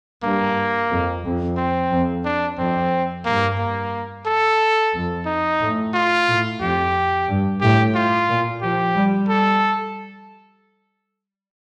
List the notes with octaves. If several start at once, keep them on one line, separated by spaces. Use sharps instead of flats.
G2 A#3
F2
F2
C4
F2
D4
F2 C4
G2 A#3
A#3
A4
F2
D#4
A2
F4
A2
F2 G4
G2
A2 G4
F4
A#2
F3 G4
G3
A4